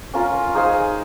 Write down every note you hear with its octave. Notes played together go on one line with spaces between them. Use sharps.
C#4 F4 A#4
D#4 G#4 C5 F5